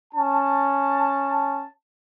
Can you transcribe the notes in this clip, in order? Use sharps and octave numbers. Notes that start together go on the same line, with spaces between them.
C#4 A5